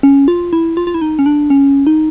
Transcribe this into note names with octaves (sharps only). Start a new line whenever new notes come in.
C#4
F4
E4
F4
F4
E4
D#4
C#4
D4
C#4
D#4